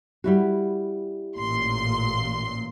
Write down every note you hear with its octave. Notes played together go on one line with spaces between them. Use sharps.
G3 E4 F#4
A1 A#2 C6